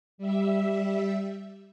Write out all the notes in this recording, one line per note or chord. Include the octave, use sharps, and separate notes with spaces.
G3 E5